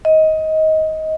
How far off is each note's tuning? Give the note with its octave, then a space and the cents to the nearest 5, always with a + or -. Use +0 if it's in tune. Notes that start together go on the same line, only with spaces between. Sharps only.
D#5 +20